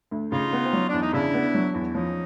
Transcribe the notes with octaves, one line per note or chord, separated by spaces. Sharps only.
D2
C#3 D#4 F4
B3
C4
F#3 C#4
E2 D4
D#4
C#3 D4 E4
B3
F#3
E2
F3 C#4 D#4